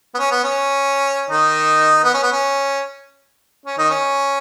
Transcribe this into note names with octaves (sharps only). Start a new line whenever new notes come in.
B3
C#4
B3
C#4
D#3 D#4
B3
C#4
B3
C#4
C#4
D#3 D#4
C#4